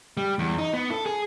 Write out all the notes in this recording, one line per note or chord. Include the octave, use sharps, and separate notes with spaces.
G3
E2
D#4
B3
A4
G#4